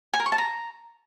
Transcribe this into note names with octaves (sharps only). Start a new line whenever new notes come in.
G#5
A#4
C#6
A5
A#5